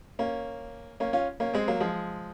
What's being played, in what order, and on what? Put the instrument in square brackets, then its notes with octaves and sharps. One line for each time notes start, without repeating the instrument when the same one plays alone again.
[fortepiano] A#3 C#4
A#3 C#4
C#4 F4
A#3 C#4
G#3 C4
F#3 A#3
F3 G#3